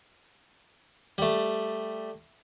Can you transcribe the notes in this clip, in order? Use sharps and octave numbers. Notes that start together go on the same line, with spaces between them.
G3 A3